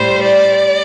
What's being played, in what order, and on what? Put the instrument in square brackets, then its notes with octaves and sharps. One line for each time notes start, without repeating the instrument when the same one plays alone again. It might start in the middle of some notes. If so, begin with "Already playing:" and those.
Already playing: [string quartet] A2 G3 C5
D5